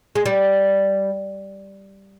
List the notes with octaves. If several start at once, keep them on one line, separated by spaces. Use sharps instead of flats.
G#3
G3